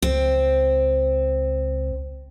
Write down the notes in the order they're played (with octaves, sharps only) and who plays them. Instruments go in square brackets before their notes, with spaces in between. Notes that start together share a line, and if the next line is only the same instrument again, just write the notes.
[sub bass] C#2 [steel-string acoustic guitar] C4